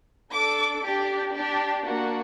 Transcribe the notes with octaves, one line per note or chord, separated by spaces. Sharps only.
D4 A4 D6
D4 G4
D4 G4
A#3 D4 F#4